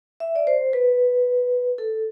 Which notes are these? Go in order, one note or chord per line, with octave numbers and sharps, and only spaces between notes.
E5
D5
C5
B4
A4